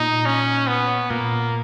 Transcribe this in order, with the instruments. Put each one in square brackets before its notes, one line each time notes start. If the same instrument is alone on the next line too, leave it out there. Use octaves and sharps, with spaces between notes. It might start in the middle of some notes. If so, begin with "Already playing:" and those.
Already playing: [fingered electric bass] A#2 [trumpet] D#4
[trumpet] C#4
B3
[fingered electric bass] A#2 [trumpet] A#3